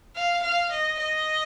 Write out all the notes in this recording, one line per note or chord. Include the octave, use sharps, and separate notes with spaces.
F5
F5
D#5
D#5